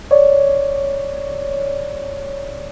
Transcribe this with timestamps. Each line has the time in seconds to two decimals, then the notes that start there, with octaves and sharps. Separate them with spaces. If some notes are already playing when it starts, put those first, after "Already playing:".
0.11 C#5 D5